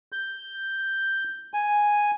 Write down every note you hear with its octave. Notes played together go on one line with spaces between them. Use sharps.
G6
G#5